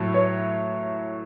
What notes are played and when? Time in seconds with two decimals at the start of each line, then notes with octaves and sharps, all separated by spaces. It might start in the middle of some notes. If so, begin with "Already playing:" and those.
Already playing: A2 F#3 A3
0.14 C#5